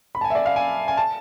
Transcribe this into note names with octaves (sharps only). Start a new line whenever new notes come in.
B5
A5
G#5
E5
D5
F5
G#5
G#5
A5